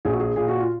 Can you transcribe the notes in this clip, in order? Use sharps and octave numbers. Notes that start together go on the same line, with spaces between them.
A#1 G#4
F#4
G#4
A#2 G#4
F#4
F4